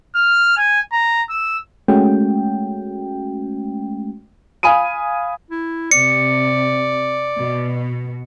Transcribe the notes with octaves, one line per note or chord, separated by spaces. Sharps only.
F6
G#5
A#5
E6
G#3 A3 C#4 F#4 G5
F5 G#5 B5 D#6 D#7
E4
C3 D5 C#7
B2